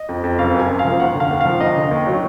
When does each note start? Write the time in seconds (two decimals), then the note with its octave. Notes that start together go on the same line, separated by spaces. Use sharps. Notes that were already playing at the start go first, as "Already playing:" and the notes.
Already playing: D#5
0.09 F2
0.24 F2
0.38 F#1 F5
0.54 F#2 G#5
0.69 F#1
0.79 F5
0.85 F3
1.00 D#2 F#5
1.14 D3
1.20 F5
1.30 D#2
1.41 F3 F5
1.60 D#2 D#5
1.76 D3
1.91 D#2
2.07 F#3